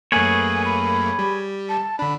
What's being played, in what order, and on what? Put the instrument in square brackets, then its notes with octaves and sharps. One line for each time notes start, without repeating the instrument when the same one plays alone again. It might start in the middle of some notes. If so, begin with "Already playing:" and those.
[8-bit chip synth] F#2 A3 A#3 [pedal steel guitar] G#4 B4 C#5 [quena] G#5
[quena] B5
[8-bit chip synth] G3
[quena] A5
[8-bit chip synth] D3 D4 [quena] B5